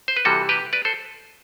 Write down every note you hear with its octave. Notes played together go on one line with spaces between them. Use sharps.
C5
B4
C3 E3 G3 F#4 A4
G4 B4
B4 D5
A4 C5